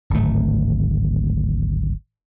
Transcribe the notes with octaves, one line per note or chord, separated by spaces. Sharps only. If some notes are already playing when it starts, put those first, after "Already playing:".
D1 G#1 A3